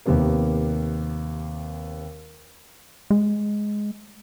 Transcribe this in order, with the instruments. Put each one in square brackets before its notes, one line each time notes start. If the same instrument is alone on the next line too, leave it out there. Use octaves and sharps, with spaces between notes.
[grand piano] D#2 C3 B3 A#4
[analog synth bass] G#3